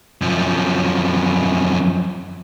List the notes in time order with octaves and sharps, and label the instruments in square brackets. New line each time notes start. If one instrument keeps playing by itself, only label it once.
[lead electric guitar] F#2 F3